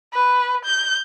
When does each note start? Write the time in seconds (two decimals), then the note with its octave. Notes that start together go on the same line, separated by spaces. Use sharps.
0.13 B4
0.64 G6